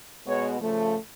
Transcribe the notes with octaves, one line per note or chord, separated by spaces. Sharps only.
B2 G#3 B3 C#5
C#3 F3 A3